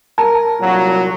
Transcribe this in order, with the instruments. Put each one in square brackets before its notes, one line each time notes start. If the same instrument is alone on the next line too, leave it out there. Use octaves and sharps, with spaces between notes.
[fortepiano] A#4 [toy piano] A5
[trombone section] C2 A#2 F#3